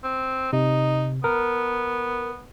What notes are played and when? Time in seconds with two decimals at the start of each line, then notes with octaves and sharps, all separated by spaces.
0.04 C4
0.53 C3 D#4
1.24 B3 A#4